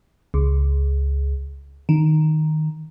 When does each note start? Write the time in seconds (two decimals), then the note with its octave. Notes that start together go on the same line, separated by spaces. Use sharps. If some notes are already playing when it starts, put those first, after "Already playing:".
0.34 C#2
1.89 D#3